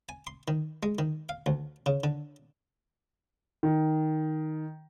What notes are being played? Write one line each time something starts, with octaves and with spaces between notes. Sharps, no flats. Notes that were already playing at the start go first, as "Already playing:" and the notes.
G#5
C6
D#3
G#3
D#3
F5
D2
C#3
D3
D#3